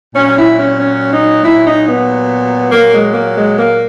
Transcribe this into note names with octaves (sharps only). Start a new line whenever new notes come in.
A#2 F#3 C#4
E4
C#4
C#4
D#4
A#2 F#3 E4
D#4
B3
A#2 F#3 A#3
G#3
A#3
G#3
A#3